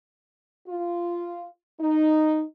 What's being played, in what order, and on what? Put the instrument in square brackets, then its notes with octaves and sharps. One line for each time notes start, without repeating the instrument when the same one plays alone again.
[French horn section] F4
D#4